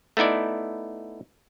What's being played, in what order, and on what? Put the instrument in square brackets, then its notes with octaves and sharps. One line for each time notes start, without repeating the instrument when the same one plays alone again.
[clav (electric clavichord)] A3 B3 D#4 E4 D5